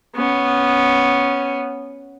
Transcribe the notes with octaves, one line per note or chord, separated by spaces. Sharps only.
B3 C#4